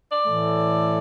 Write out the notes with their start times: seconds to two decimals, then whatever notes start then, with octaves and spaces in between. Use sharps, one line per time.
0.09 D5
0.25 A2 E3 A3